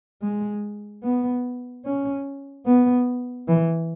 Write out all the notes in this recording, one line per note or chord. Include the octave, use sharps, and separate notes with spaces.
G#3
B3
C#4
B3
E3